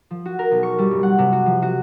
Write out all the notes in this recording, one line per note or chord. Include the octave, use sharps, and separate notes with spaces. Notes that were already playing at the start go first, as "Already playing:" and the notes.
F3
F#4
A#4
B1
C#6
G3
F#1
F#5
C3
F#4
F3
F#4